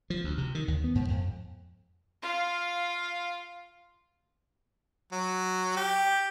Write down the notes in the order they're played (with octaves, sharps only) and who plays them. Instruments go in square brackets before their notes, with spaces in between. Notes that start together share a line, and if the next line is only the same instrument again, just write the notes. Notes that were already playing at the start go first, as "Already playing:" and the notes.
[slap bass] F3
D2
C3
D#3
D#2
B3
G#2
F2
[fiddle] F4 F5
[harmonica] F#3
G4